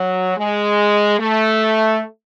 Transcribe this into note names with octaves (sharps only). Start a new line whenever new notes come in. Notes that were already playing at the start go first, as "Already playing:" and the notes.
Already playing: F#3
G#3
A3